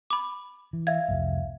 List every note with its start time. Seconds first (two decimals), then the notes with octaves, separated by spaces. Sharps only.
0.10 B5 D6
0.73 E3
0.87 E5 F5 G#6
1.08 C2 F2 A2